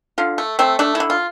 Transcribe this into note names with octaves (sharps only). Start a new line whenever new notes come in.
D3 F4
A3
A3 C4
A3 D4
E4
D3
F4